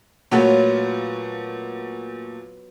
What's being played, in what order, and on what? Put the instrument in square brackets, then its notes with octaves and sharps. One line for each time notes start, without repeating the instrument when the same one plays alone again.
[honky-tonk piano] A#2 A3 F#4 [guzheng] F#3 B3 F4